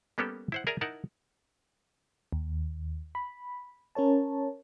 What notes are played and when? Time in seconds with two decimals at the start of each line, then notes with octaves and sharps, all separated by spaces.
0.18 G3 A#3 B3 C#4 G4 A4
0.52 E4 C5 F#5
0.67 G#4 A#4 D5 E5 G#5 A#5
0.81 D#4 E4 A#4 F#5 A5
2.32 D#2
3.15 B5
3.95 C#4 A#4 C#5 A5